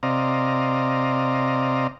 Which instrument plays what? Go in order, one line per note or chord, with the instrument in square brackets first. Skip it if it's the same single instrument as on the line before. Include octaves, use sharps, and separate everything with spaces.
[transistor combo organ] C3 C4 D5 D#5 F5 A#5